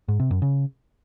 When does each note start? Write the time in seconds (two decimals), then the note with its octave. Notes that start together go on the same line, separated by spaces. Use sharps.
0.08 G#2
0.20 C3
0.31 F#2
0.42 C#3